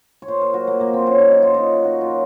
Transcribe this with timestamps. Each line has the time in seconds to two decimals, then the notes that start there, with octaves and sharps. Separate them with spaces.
0.22 C#5
0.28 A#2 C5
0.41 A#4
0.54 F#3 F#4
0.67 A#3
0.79 A#2 A#3
0.93 C4
1.06 F#3 C#4
1.19 D#4
1.32 A#2 D#4
1.43 F4
1.54 F#3 D#4
1.84 A#2 F#4
2.01 F4
2.09 F#3